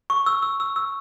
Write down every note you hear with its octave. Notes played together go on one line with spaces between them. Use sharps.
C#6
E6
E6
E6
E6